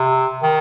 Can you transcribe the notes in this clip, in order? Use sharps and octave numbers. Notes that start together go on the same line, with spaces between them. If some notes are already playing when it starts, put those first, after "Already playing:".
Already playing: C3
D#3